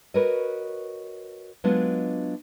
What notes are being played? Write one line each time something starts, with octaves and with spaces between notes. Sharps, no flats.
F#4 A#4 B4 C#5 D#5
F#3 G#3 B3 D4 F4 D#5